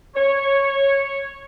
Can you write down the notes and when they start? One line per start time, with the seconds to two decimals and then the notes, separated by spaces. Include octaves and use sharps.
0.15 C#5